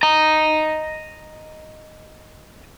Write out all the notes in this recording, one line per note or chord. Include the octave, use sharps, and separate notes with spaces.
D#5 A#5